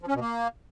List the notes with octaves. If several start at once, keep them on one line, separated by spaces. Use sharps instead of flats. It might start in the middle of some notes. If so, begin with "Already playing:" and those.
F3
C#4
B2
A#3